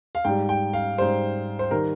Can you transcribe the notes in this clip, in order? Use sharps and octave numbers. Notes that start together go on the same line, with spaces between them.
F5
G#2 G3 G5
G5
F5
G#2 G3 C5
C5
D#3 G3 A#4